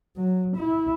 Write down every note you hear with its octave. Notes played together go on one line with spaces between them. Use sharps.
F#3
E4